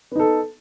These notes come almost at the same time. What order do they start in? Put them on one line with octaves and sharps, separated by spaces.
B3 D#4 A4